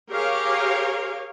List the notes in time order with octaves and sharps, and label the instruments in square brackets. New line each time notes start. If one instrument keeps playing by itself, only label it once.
[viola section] G4 G#4 A#4 C#5 F5